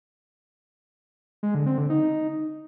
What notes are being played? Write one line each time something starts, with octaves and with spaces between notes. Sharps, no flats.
G#3
D3
C4
D3
D#4